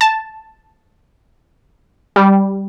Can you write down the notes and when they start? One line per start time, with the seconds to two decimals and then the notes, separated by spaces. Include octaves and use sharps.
0.01 A5
2.16 G3